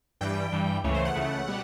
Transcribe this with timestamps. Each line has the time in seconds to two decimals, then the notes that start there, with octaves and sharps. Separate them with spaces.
0.21 G2 E3 G3 G5
0.52 G2 E3 G3
0.84 C#2 C#3 E3 A3 C#5
0.94 C5
1.05 F#5
1.15 C#2 C#3 E3 A3
1.47 B2 G3